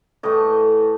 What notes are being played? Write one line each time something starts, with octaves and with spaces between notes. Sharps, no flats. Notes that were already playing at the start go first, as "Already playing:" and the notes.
A2 E3 A3 D#5